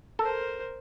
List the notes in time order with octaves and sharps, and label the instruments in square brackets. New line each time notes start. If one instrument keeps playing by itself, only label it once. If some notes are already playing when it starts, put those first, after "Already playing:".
[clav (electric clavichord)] A4 [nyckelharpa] A#4 C5